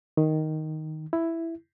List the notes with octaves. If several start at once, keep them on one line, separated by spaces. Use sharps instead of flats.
D#3
E4